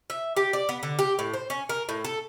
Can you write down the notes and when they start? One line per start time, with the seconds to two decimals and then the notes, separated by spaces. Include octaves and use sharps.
0.10 E5
0.37 G4
0.53 D5
0.69 B3
0.83 D3
0.99 G4
1.19 A2
1.33 C5
1.50 C#4
1.69 A#4
1.89 A2
2.05 A4